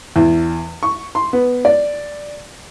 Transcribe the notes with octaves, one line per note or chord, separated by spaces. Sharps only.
E2
C#6
C6
B3
D5